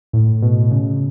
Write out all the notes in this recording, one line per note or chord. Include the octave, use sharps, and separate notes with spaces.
A2
B2
C#3